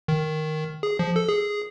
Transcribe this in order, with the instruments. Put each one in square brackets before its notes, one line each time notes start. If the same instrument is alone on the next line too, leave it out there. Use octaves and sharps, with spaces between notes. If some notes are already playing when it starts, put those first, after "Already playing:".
[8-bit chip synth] D#3
G#4
F3
A4
G#4